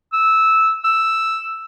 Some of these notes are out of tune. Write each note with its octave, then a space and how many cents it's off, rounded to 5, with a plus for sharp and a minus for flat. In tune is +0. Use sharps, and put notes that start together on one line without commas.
E6 -10
E6 +0